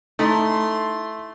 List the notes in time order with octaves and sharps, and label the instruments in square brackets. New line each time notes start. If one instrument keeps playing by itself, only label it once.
[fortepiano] A3 [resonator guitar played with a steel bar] D#4 E4 A4 [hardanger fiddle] C6